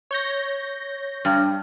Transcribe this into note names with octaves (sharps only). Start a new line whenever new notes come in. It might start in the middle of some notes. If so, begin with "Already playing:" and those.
C#5 G6 A#6
G2